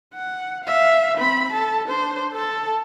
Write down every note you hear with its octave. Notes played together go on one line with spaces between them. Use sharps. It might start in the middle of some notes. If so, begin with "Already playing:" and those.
F#5
E5 F5
C4 B5
A4 A5
D4 C5
A4 A5